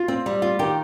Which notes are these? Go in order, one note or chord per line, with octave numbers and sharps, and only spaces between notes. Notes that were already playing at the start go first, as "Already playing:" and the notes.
Already playing: F4
C4
G3
F4
D#3 G4